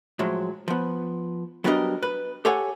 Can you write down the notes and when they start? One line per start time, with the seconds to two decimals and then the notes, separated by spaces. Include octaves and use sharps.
0.19 A2 F3 F#3 G#3
0.68 F3 B3
1.64 F#3 G3 B3 D4 A#4 D#5
2.03 B4
2.45 G4 A4 C#5 F#5 G#5